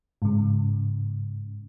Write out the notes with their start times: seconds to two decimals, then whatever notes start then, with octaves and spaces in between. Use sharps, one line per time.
0.22 G#2 C#3